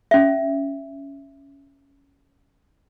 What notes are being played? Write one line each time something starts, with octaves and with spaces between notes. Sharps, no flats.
C#4 E5